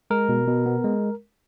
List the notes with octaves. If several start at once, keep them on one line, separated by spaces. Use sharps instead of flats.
G#3 A#4
B2
B2
B3
G#3